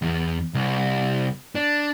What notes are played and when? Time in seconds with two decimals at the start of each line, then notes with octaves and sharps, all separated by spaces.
0.02 E2
0.54 C2
1.55 D4